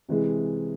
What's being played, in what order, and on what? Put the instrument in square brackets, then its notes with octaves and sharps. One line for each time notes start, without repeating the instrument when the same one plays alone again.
[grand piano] C3 E3 G#3